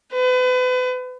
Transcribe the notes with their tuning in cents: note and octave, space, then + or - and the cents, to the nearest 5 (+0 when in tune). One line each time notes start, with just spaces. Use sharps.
B4 +35